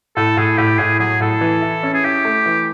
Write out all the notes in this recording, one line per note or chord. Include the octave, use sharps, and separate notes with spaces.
A2 A4
A2 G#4
A2 G4
A2 G#4
F#3 G#4
A2 A4
E3
E4
C#4
G#4
E4 G4
A3
E3